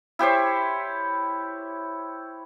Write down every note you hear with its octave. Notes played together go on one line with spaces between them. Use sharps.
E4 G4 C5 C#5